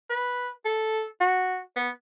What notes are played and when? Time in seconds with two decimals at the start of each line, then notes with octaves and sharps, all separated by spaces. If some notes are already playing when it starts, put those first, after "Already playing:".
0.10 B4
0.65 A4
1.21 F#4
1.76 B3